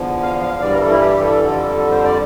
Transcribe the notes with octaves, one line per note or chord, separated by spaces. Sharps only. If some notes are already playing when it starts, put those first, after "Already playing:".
Already playing: E2 D3 F3
F5
F5
G2 E3 G3 D5
A#4
A4
E4
G4
A4
F2 D3 G3
A4
C5
D5